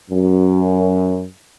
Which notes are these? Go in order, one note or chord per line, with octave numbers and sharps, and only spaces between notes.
F#2